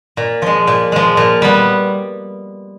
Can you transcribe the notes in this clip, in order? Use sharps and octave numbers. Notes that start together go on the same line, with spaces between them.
A#2
F3 G#3
A#2
F3 G#3
A#2
G3 B3